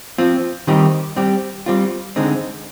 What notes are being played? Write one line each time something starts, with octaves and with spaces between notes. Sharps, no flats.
F3 C4 F4
D#3 G3 C4 D#4 G4
G3 C4 G4
G3 C4 F4
D3 G#3 C4 D#4